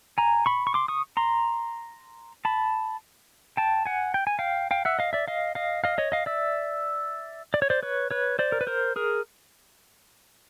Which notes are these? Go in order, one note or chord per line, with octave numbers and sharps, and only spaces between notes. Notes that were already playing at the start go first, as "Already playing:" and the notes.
G#5 A#5
B5 C#6
C#6
C6 D6
C#6 D#6
A#5 C6
A5 B5
G5 A5
F#5 G#5
G5
G#5
F5 G5
F5 G5
E5 F#5
D#5 F5
D5 E5
D#5 F5
D#5 F5
D#5 F5
C#5 D#5
D#5 F5
D5 E5
D5
C#5
C5 D5
B4 C#5
B4 C#5
C5 D5
A#4
B4
A#4 C5
G#4 A#4